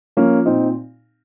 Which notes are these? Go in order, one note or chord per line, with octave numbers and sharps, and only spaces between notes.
F3 A#3 C#4
A#2 C4 D#4